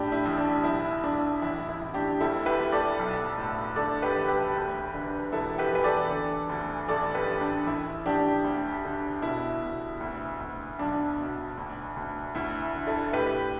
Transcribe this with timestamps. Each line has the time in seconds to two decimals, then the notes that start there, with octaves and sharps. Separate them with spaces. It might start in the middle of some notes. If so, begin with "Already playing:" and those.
Already playing: A2 D4 G4
0.12 E4
0.25 A1
0.38 D4
0.64 B1 E4
1.03 B1 D4
1.42 A1 E4
1.69 E4
1.81 A1
1.94 D4 G4
2.20 D2 E4 A4
2.46 G4 B4
2.60 D2
2.72 A4 D5
2.99 B1
3.38 A2
3.76 D3 A4 D5
4.02 G4 B4
4.15 E1
4.28 G4 B4
4.55 D2
4.94 D3
5.32 E1 E4 A4
5.58 G4 B4
5.72 E3 B4
5.84 A4 D5
6.10 D3
6.49 D2
6.88 A1 A4 D5
7.15 G4 B4
7.27 A1
7.41 D4
7.66 A1 E4
8.06 A1 D4 G4
8.44 D2
8.84 D3
9.22 B2 E4
9.61 B2
10.00 D2
10.40 D2
10.79 B1 D4
11.18 B2
11.57 D2
11.96 D2
12.35 D2 E4
12.75 D3
12.87 E4 A4
13.13 A2 G4 B4